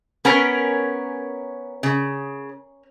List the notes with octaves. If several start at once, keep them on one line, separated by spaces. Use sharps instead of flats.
B3 C#4 A#4 C#5
C#3